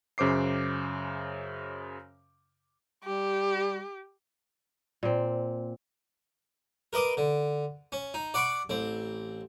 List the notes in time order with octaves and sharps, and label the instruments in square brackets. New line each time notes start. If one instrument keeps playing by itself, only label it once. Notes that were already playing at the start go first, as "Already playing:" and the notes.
[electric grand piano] F#2 C#3 C5 D6 C7
[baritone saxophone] G3 [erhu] G4
[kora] A#2 C4
[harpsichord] A#4 B4 D#5 D6 D#6
D3
C#4
D#4
D5 F#5 B5 C#6 D6
A1 C4